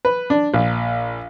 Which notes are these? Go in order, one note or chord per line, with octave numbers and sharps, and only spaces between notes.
B4
D4
A#1